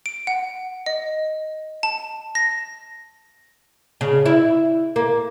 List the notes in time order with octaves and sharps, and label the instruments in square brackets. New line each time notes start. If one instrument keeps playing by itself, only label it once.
[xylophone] D7
F#5
D#5
A5
A#6
[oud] C#3
E4
A#3